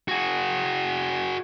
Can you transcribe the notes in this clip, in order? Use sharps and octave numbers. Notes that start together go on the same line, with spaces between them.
F#4 G#4